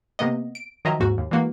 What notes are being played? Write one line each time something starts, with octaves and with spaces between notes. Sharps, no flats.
C3 A#3 B3 D#5
D7
D#3 F3 F#3 D#5 E5 A#5
D#2 G#2 F#4
D#2
E3 G#3 A#3 F#4